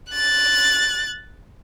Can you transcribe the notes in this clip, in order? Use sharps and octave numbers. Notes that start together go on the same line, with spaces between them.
F#6 A6